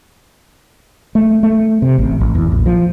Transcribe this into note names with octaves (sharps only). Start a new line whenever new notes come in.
A3
A3
C3
A1
A1
E2
A#1
F3